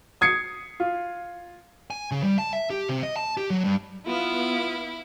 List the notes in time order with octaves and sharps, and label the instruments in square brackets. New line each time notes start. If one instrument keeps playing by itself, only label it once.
[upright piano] D#6 G#6 C7 C#7
F4
[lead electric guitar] G#5
C#3
G3
A5
E5
G4
C3
D#5
A5
G4
F#3
G2
[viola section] B3 F5 [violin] E4 [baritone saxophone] F4